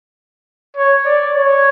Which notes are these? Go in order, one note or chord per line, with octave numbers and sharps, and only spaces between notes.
C#5
D5
C#5